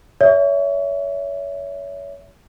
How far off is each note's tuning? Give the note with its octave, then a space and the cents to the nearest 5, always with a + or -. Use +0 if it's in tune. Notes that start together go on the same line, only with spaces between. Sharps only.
C#5 +30 E5 +0